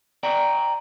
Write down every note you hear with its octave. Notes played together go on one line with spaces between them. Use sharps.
D5 G5 A#5